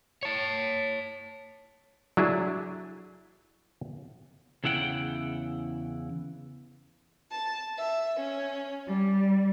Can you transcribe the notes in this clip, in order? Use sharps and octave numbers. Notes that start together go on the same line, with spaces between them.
C#5 A5
F#3 D4 E4 G#4
E2 C#3 E4 F#5 G5
A5
E5
C#4
G3